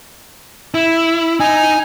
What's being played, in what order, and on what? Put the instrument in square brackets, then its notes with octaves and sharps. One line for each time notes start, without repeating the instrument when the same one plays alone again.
[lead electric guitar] E4
[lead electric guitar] D#4 [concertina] G#5